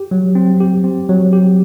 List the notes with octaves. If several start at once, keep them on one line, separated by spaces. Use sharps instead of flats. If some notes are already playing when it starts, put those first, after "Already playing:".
Already playing: G4
F#3
C4
G4
C4
F#3
G4